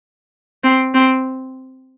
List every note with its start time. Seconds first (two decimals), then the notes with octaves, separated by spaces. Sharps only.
0.64 C4
0.94 C4